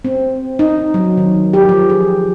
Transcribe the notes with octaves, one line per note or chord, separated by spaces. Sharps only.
C4
D#4
F#3
D#3
G4
F3
G#4